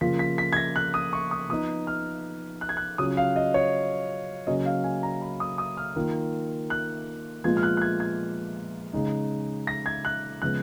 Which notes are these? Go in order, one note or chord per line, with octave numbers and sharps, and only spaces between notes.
C#3 F3 A#3 F4 B6
B6
B6
G#6
A#6
F#6
D#6
C#6
D#6
F3 B3 D#4 D#6
F6
F#6
G#6
F#6
C#3 F#3 C#4 F4 D#6
F5
D#5
C#5
C#3 F#3 A#3 C#4 D#5
F5
G#5
A#5
B5
D#6
D#6
F6
D#3 A#3 F4
F#6
A#2 F3 G#3 B3 F4 G#6
F6
F#6
F#6
G#6
G#6
C#3 G#3 D#4
A#6
G#6
F#6
C#3 F3 G#3 B3 F#6